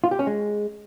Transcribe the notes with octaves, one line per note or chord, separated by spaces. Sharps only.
F4
G4
C#4
G#3